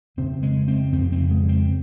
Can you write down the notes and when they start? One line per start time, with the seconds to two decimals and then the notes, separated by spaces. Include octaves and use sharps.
0.17 F2 C#3 C4
0.43 G#3
0.68 C4
0.92 F2 C#3 C4
1.12 C4
1.31 G#3
1.49 C4